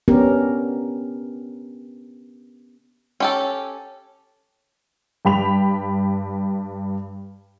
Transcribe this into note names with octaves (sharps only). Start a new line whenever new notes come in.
B3 C#4 D4 G4 A#4
C#4 G4 A4
G2 G5 B5 F7